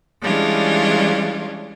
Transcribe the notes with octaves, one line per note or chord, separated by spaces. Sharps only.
E3 G3 G#3 C#4 D4 F4